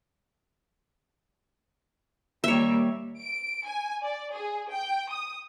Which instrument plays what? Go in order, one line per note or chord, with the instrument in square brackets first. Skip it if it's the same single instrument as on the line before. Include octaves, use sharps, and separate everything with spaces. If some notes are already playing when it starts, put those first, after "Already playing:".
[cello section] D#2 G3 A#3 [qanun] C#5 E5
[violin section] D7
G#5
D5
G#4
G5
D#6